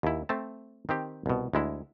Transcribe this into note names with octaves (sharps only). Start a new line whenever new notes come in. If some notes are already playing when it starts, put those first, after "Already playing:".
D#2 E4
A3 C4 A5
D#3 C4 G4
C2 B2
D2 G#3 E4